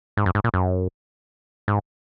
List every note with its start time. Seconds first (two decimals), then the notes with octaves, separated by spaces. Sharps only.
0.17 G#2
0.26 F#2
0.35 G#2
0.44 A#2
0.54 F#2
1.68 G#2